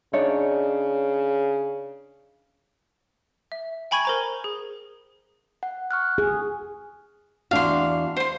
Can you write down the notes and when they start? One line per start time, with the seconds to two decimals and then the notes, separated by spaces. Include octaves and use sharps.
0.13 C#3 D4 D#4 C#5
3.52 E5
3.91 G5 G#5 B5 C#6 G#6 D#7
4.05 A#4 C5 A#5
4.44 G#4
5.63 F#5
5.91 C#6 F6 F#6
6.18 G#4
7.51 E2 D4 F#4 F5 C6
8.17 C5 C6